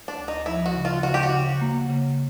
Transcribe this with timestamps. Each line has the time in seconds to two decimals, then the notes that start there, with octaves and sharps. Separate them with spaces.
0.08 D4
0.18 D2
0.28 D#4
0.46 F3 E4
0.66 F#4
0.75 C#3
0.85 F4
1.03 C#3 F#4
1.14 G4
1.23 F#4
1.32 C#3
1.61 A#3
1.90 C#3